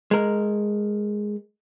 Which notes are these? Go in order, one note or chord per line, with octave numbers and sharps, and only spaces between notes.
G#3 A#4